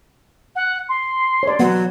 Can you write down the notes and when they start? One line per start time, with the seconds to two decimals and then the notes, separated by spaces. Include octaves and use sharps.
0.55 F#5
0.89 C6
1.43 C#5 D5
1.59 F#3 B3 F#5